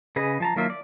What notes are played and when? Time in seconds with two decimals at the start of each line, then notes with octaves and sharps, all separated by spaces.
0.16 C#3 G#4 B4 D#5
0.40 F3 A5 A#5
0.56 D#3 F#3 A#3 F4 E5
0.70 D5